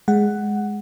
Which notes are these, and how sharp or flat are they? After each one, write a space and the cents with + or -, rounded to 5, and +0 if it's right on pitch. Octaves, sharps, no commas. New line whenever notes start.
G#3 +0 F#5 +5